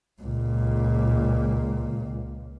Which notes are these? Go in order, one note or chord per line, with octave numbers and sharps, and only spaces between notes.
C#2 A#2